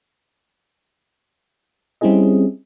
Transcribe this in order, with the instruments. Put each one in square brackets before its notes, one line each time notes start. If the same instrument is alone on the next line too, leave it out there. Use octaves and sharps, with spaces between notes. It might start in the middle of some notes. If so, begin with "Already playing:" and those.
[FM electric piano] G3 C4 C#4 E4 G#4 D#5